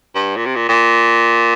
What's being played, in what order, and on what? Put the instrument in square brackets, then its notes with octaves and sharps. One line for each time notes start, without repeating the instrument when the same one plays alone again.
[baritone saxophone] G2
A#2
C3
A#2
A#2